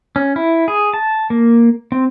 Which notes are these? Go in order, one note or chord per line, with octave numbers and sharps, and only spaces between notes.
C#4
E4
G#4
A5
A#3
C4